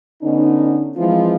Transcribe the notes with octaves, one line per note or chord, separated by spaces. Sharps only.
D3 B3 C#4 D#4
E3 F3 G#3 C4 E4 F4